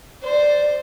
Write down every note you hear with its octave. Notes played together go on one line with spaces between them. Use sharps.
C5 D5